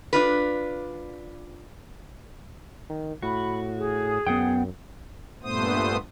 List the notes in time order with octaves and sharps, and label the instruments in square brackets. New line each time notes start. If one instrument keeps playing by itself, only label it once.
[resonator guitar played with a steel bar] D4 F4 B4
[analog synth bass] D#3
[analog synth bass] A2 [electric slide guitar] F#4 [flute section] B5
[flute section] G#4
[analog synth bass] F#2 [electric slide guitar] B3 F#5 G5
[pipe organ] G2 A#2 A3 B3 C5 D#6